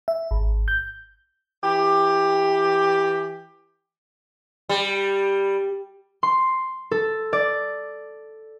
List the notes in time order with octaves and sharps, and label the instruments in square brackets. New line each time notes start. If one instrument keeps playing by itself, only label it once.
[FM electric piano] E5
G#1
G6
[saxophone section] E3 G4
[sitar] G3
[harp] C6
A4
D5